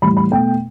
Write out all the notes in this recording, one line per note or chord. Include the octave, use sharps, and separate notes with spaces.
A2 E3 G3 B5
B5
B2 A3 G5